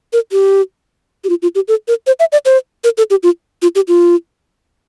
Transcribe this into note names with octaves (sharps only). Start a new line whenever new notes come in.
A#4
G4
G4
F4
F4
G4
A4
A#4
C5
E5
D5
C5
A#4
A4
G4
F4
F4
G4
F4